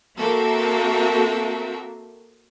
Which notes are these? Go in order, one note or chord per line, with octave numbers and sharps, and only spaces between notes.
A#3 C4 F#4 A4 A#4 E5